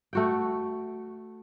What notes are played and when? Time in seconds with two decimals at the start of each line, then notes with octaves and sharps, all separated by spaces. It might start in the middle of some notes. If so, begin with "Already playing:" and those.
0.13 A3 F#4 G5